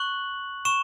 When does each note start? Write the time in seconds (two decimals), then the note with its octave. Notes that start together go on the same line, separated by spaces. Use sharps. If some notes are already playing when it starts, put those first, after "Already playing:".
Already playing: C#6 F#6 F#7
0.65 C#6 E7